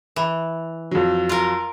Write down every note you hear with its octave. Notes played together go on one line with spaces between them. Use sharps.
E3
F2 F#3
F4 A#4